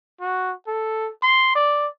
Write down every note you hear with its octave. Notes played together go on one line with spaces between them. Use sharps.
F#4
A4
C6
D5